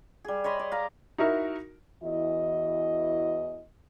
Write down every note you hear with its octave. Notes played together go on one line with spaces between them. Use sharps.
G3 G#4
C#5 D#5 B5 C6
D5
F5 A#5
D#4 E4 F#4 A#4 E5
E2 E3 E4 F#4 D#5